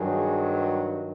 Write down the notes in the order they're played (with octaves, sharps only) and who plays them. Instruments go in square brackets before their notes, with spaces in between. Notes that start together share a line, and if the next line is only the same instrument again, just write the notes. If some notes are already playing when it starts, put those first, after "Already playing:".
Already playing: [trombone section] G2 D#3 F#3 G#4